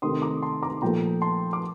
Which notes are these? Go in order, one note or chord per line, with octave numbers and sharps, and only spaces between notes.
C3 D#3 A3 C6 D#6
A#5 D6
A5 C6
A#5 D6
A#2 F3 A3 G5 A#5
A5 C6
D6